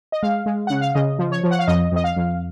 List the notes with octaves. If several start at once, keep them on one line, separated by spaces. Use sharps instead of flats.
D#5
G#3 F5
G#3
C#3 F#5
F5
C#3 D#5
F3
C#5
F3
F#5
F5
F2 D#5
F2 D#5
F5
F2